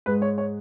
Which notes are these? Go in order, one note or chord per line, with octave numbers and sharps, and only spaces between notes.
G#2 G#3 B4
C#5
C#5